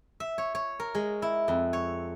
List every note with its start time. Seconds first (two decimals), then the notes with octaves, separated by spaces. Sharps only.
0.20 E5
0.38 C#5
0.55 C#5
0.80 A#4
0.95 G#3
1.22 E4
1.48 F2
1.73 C#5